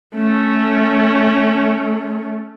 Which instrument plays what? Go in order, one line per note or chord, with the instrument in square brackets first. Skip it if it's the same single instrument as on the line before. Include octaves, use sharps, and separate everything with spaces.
[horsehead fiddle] A3 C#4